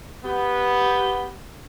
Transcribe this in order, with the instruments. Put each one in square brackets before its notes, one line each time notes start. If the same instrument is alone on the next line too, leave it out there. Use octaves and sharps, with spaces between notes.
[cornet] B3 [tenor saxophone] G4